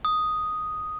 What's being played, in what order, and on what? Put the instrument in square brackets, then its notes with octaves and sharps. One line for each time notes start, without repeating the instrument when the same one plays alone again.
[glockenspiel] D#6